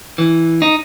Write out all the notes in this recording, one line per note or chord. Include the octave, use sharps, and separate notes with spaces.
E3
D#4